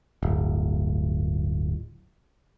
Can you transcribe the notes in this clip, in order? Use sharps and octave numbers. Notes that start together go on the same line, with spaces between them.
D1 G1